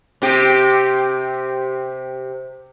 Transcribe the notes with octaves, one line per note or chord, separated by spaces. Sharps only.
C3 G4